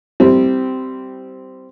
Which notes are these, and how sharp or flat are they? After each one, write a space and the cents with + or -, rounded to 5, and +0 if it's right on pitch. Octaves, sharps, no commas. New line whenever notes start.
G3 -20 C4 -10 E4 -20